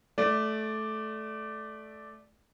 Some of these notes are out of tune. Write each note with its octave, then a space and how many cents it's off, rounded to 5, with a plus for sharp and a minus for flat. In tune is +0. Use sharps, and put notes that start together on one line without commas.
A3 -15 D5 +0